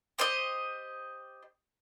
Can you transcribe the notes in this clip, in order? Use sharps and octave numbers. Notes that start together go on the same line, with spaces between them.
G4 C5 D#5